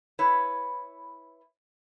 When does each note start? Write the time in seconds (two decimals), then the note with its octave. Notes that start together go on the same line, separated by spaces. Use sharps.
0.19 E4 B4 C#5